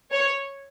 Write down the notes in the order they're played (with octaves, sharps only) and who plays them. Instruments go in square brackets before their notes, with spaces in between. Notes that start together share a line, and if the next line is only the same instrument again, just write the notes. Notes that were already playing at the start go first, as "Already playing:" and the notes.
[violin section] C#5